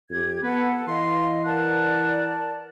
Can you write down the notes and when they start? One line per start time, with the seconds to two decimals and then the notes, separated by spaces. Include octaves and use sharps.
0.10 F2 G4 G#6
0.43 B3 A4 B4 F#5
0.88 E3 D#5 F5 C6
1.45 A#4 D5 F#5 A5